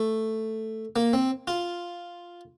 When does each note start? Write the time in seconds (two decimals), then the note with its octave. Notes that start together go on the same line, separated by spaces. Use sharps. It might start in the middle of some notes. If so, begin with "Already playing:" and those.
Already playing: A3
0.96 A#3
1.13 C4
1.47 F4